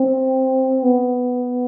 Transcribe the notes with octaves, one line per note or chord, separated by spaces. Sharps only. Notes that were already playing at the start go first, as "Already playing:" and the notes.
Already playing: C4
B3